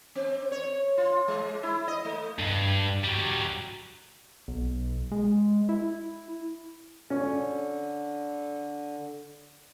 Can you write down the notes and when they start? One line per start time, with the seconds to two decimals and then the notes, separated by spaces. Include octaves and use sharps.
0.15 C4
0.52 C#5
0.97 F4
1.28 G#3
1.63 E4
1.88 D#5
2.05 A3
2.39 G2
3.04 F#3 G3
4.48 B1
5.11 G#3
5.69 E4
7.10 D3 C#4